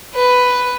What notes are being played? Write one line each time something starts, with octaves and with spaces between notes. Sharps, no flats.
B4